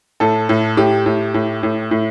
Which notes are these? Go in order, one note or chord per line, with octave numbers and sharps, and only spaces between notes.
A2 A4
A2
A2 G4
A2
A2
A2
A2